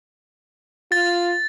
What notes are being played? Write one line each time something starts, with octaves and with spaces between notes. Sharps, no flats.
F4 A6